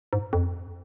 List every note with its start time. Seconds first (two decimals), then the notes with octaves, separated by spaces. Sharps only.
0.13 G#2
0.33 F2